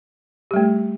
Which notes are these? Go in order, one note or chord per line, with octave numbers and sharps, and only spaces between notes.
G3 A3 G4